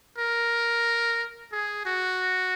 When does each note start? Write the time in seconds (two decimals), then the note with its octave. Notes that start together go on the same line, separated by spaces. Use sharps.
0.18 A#4
1.52 G#4
1.85 F#4